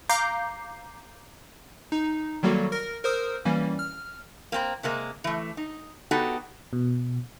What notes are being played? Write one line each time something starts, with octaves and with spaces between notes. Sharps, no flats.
F5 A#5 D6 G6 C7
D#4
D#3 F#3 G3 A#3 F#4 A4
A#4 A#6
A#4 C5 D#6 E6
E3 G3 A#3 C#4
F6
A#3 C4 A#5
C3 G#3 A#3
E3 A3
D#4
B3 D#4 F#4 G4 A4
B2